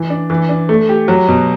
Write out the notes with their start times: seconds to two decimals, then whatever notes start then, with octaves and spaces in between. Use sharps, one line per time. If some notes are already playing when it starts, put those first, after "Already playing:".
Already playing: E3
0.10 D4
0.30 E3
0.49 D4
0.69 A3
0.89 G4
1.08 F#3
1.28 B2